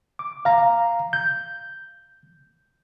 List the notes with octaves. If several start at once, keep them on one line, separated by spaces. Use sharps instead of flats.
D6
F5 A#5
G6